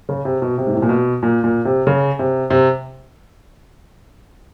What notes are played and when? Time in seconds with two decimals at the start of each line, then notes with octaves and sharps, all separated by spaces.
0.09 C#3
0.25 C3
0.42 B2
0.58 C3
0.67 G#2
0.73 A2
0.82 A#2
0.89 B2
1.23 A#2
1.44 A#2
1.65 C3
1.87 C#3
2.19 C3
2.50 C3